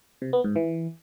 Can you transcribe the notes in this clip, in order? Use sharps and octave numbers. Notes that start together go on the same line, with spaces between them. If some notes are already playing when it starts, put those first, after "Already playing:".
C3
B3
G#2
E3